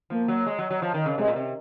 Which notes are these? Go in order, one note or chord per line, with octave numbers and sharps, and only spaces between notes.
F3 A#3
F#3
G#3
F#3
F#3
F3
D#3
C#3
C3 G#3
A#2
C3